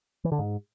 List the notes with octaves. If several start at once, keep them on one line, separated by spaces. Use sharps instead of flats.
E3
D3
G#2